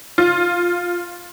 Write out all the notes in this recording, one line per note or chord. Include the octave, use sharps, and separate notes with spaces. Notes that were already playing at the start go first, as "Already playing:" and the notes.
F4